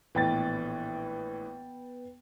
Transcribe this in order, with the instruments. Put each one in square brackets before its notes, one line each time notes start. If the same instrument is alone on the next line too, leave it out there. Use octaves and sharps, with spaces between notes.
[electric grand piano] A#1 A2 E3 [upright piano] B3 G5 A6